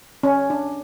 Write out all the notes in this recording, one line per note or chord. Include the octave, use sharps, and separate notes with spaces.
C#4
D4